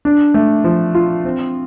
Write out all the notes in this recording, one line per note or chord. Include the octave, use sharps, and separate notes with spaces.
D4
A3
F3
F4
C4